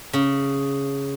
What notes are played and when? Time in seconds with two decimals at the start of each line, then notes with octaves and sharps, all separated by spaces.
0.13 C#3